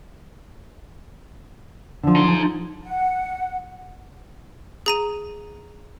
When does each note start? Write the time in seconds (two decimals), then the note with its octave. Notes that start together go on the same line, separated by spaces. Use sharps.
2.03 D3 F3
2.16 D#4 C6
2.28 F3
2.83 F#5
4.86 G#4 A#5 D#7